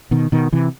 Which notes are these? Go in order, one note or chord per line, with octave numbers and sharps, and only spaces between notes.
B2 D#3
B2 D#3
C3 E3